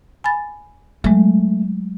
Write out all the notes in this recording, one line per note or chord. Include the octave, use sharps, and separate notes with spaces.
G#5 B5 A6
F#3 G#3 A3